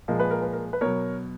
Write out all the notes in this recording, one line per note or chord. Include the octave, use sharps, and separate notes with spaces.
A#2 F3 G#3 A#4
B4
A#4
B4
A#4
B4
B2 F#3 A#4 C#5